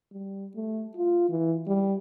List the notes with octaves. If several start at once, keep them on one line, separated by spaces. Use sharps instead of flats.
G3
A3
F4
E3
G3